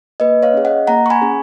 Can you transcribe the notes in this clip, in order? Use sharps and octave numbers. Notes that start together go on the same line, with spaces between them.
A#3 B4 D#5
C#5 F5
C#4 G#4
D#5 F#5
A#3 F#5 A#5
C#6
G#5 B5
C#4 G#4